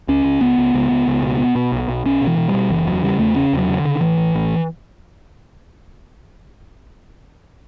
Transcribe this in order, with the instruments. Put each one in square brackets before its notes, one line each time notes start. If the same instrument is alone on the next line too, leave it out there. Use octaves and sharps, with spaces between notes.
[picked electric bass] C#2 C#4
C#2
C#2 B3
C#2
C#2
C#2
C#2
B2
B2
B2
B1
B1
B1 C#4
B2
E3
B2
G3
B2
F#1 E3
E2 F#3
C#3 G3
E2 A3
C#3 C#4
E2 F#3
C#3
D3
C#3
A1 E3
A1
A1